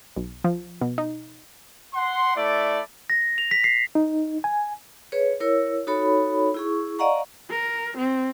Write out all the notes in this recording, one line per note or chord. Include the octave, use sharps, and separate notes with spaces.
B1
F3
B2
D#4
F#5 C6
A3 E4 D5
A#6
F7
B6
C7
D#4
G#5
G#4 B4 C#5
E4 A#4 C#5 E6
D#4 F#4 A4 C#5 B5
E4 G#4 C#6
D5 D#5 F5 F#5 A#5 C#6
A#4
C4